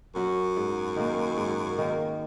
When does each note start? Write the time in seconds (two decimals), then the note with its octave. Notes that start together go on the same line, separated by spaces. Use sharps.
0.15 F#2 F#3 C#4 F#4
0.57 G#2
0.96 D#3 A#3
1.37 G#2
1.78 D#3 A#3